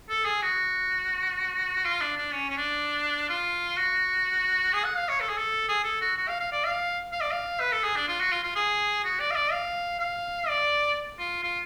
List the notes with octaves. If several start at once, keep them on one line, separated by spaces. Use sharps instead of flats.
A4
G#4
F#4
F4
D4
D4
C#4
C#4
D4
F4
F#4
G#4
F#5
F5
C#5
A4
G#4
A4
G#4
A4
F#4
F#4
F5
F5
D5
F5
F5
D5
F5
B4
A4
G#4
D4
F4
F#4
F4
F4
G#4
F#4
D5
F5
D5
F5
F5
D5
F4
F4